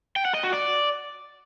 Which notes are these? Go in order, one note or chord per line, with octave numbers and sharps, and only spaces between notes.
G5
F#5
D#5
F#4
D5